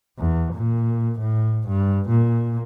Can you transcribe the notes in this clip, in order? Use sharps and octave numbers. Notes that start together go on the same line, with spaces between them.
E2
A#2
A2
G2
A#2